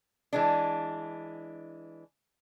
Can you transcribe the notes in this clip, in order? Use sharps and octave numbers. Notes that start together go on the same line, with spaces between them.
E3 G#3 D4